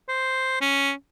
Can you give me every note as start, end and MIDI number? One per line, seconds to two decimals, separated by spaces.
0.09 0.58 72
0.61 0.92 61